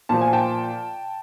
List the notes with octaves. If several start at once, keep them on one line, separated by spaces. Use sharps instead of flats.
A#2 F3 A5
G#5
G5 A5